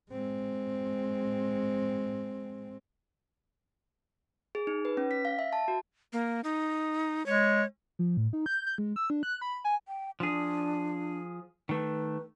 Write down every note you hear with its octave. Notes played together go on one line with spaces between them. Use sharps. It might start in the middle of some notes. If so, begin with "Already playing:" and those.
G#3 C4
G#4
D#4
B4
C#4
B6
F5
E5
A5
F#4
A#3
D#4
G#3 C#5
F3
A2
D#4
G6
G6
G#3
E6
D4
F#6
B5
G#5
G5
F3 D4 G#4
D#3 A3 B4